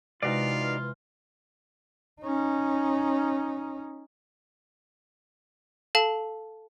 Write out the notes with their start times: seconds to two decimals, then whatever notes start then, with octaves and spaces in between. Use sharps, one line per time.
0.23 C3 E3 G#3 D#4 F4 F#4 D5 F5
2.22 C#4 D#4
5.95 A4 F5 A5